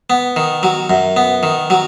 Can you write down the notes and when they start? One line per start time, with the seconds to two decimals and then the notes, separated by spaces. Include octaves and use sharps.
0.10 B3
0.36 D#3
0.63 F#3
0.90 F#2
1.17 B3
1.43 D#3
1.70 F#3